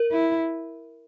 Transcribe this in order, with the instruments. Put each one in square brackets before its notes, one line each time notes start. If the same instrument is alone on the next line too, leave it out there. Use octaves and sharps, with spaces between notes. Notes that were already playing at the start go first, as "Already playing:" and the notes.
Already playing: [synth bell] A#4
[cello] E4